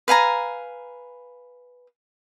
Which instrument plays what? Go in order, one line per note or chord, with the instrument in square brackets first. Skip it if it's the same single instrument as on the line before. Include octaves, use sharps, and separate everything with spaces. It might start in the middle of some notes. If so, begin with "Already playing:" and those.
[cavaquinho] B4 F5 G#5 A#5